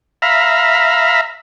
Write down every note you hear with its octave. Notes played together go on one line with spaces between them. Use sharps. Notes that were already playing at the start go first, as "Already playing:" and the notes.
E5 F5 A#5 B5